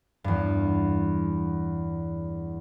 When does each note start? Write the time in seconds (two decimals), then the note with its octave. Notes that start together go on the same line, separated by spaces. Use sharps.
0.24 E2 G2